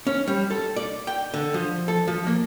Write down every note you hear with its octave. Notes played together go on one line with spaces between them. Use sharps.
C#4
G3
A4
D5
G5
D3
F3
A4
F3
A#3